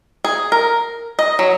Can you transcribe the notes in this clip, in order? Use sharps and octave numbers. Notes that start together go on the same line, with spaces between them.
G#4
A#4
D#5
F#3